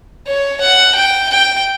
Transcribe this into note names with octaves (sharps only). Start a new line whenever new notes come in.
C#5
F#5
G5
G5